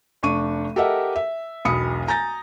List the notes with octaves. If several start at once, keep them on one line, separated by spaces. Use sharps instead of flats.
F1 D4 C#6 D#7
G4 A4 A#4 D#5 E5 F#5
E5
E1 B1 B5 D#6 C#7
G#5 A#5 G6 A6 A#6